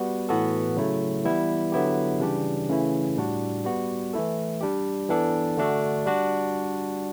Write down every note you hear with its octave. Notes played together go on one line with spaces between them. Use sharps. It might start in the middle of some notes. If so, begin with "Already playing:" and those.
Already playing: G3 B3 F#4
A2 E3 B3 F#4 A4
C#3 F#3 A3 E4
E3 G3 B3 E4
D3 F#3 B3 E4 G4
C#3 E3 G3 D4 G4
C#3 E3 A3 C#4 E4
A2 G3 D4 F#4
G3 B3 F#4
E3 A3 E4 A4
G3 D4 G4
E3 B3 D4 A4
D3 A3 D4 F#4 A4
G3 D4 F#4